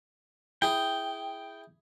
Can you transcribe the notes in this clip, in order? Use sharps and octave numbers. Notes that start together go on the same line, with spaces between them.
E4 G#4 G5